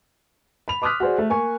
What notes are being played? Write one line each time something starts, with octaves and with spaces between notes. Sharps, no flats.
B5 F7
C6 D6 D#6 F6 F#6 B6
F#4 G#4 C5 D5
A3
A#3 G#5 C#6